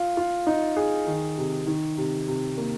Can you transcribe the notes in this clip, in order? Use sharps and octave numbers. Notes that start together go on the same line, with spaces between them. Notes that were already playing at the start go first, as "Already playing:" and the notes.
Already playing: F4
F4
D#4
G#4
D#3
C3
D#3
C3
C3
A#3